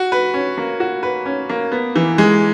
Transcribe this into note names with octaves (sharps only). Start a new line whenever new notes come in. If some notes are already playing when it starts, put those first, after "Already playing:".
Already playing: F#4
B4
C#4
A#3
F#4
B4
C#4
A#3
B3
E3
G#3